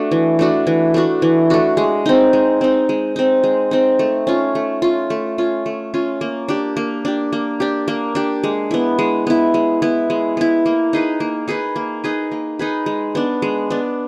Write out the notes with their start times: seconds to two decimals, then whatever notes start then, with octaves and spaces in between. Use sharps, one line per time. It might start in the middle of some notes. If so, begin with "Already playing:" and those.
Already playing: A3 D4 F#4
0.11 E3
0.39 A3 D4 F#4
0.67 E3
0.94 A3 D4 F#4
1.22 E3
1.50 A3 D4 F#4
1.77 G#3
2.06 C4 D#4
2.33 G#3
2.61 C4 D#4
2.89 G#3
3.16 C4 D#4
3.43 G#3
3.71 C4 D#4
3.99 A3
4.27 C#4 F4
4.55 A3
4.82 C#4 F4
5.10 A3
5.38 C#4 F4
5.66 A3
5.94 C#4 F4
6.21 A#3
6.48 D4 G4
6.77 A#3
7.05 D4 G4
7.33 A#3
7.60 D4 G4
7.88 A#3
8.15 D4 G4
8.44 G#3
8.71 B3 E4
8.99 G#3
9.27 B3 E4
9.54 G#3
9.82 B3 E4
10.10 G#3
10.37 B3 E4
10.66 A#3
10.93 D#4 G#4 B4
11.20 A#3
11.48 D#4 G#4 B4
11.76 A#3
12.04 D#4 G#4 B4
12.32 A#3
12.59 D#4 G#4 B4
12.86 G#3
13.15 B3 D4
13.42 G#3
13.70 B3 D4